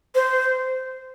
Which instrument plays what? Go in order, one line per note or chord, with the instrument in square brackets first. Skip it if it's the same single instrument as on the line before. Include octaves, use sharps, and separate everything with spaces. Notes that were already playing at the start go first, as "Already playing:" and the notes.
[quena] C5